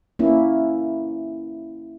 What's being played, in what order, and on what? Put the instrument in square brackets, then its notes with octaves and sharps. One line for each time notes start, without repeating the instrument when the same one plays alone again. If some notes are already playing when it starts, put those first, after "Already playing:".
[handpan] A#3 C#4 E4